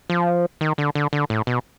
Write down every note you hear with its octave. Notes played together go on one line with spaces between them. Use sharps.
F3
D#3
D3
D3
D3
A2
B2